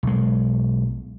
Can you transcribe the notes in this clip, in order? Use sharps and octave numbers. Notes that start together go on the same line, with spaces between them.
B1 G#3